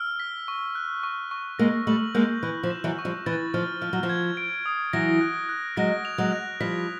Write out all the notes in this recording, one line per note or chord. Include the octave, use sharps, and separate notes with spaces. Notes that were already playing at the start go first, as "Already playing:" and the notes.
Already playing: E6 F6
B6
C#6
F#6
C#6
C#6
G#3 A#3 A#6
G3 A3 F#7
G#3 A#3 G6
E3 F#6
F3
E7
E3 F#3
C#6
F3 G3
E3 A6
F3 F6
F3 F6
F#3
F3
G#6
D7
D#6
E3 F#3 A#6
F#6
F#6
F#3 G#3 A#6
F7
F#3 G#3
F#6
F3 G3 B6